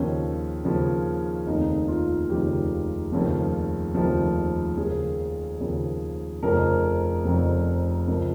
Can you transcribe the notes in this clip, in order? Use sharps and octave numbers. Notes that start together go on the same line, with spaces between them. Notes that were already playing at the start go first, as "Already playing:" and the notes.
Already playing: D#2 C#3 F3 C#4
D#2 C#3 F3
F1 D#2 C#3 D#4
F4
F1 D#2 C#3 G4
F1 D#2 C#3 F3
F1 D#2 C#3 F3
D#2 C#3 F3 G#4
D#2 C#3 F3
F1 F2 C#3 F3 A#4
F1 F2 C#3 F3
C#2 C#3 F3 A#4